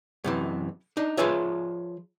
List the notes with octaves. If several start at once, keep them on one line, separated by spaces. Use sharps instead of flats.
F#2 C3 E3
D4 D#4
F3 F4 G#4 B4 C#5 E5